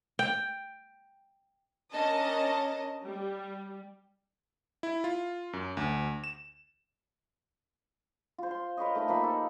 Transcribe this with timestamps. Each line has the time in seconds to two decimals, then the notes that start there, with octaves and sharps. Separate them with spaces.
0.19 G5
1.92 C#4 D4 A#4 D#5 A5
3.05 G3
4.83 E4
5.04 F4
5.53 F#2
5.77 D2
6.24 E7
8.38 F4 C5
8.51 C6
8.77 A#4 B4 C#5 D#5
8.95 A3 D#4 B5
9.08 F3 A#3 D#4 B5
9.21 G4 A4